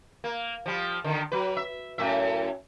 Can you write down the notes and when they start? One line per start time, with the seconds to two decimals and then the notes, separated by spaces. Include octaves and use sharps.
0.24 A#3
0.66 F3 G3
1.04 D3 D#3
1.32 F#3 B4
1.57 E5
1.98 F#2 A2 E5